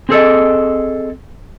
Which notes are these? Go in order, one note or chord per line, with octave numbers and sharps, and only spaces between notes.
C4 G#4 A4 D#5